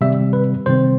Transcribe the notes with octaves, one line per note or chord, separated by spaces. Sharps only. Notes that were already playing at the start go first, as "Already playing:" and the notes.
C3 D#3 G3 C4 E5
B4
C3 D#3 G3 C4 C5